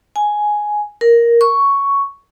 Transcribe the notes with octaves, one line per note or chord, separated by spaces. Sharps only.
G#5
A#4
C#6